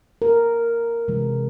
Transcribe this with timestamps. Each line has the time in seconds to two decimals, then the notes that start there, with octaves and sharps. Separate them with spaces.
0.22 A#4
1.08 C3 E3 G#3